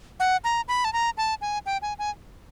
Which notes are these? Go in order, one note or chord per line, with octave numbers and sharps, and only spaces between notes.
F#5
A#5
B5
A5
A#5
A5
G#5
G5
G#5
G#5